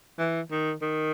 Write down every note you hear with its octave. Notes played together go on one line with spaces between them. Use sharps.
E3
D#3
D#3